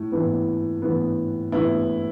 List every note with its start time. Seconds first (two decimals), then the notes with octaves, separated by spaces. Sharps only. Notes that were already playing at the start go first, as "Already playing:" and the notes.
Already playing: A2
0.12 A2 E3 B3
0.82 A2 E3 B3
1.52 A2 E3 B3 E4